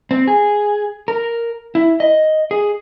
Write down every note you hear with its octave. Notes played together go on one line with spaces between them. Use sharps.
C4
G#4
A#4
E4
D#5
G#4